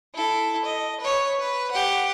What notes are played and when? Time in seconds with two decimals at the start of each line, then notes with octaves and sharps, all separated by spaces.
0.15 E4 A4
0.65 D#5
1.00 B4 C#5
1.39 B4
1.71 G4 F#5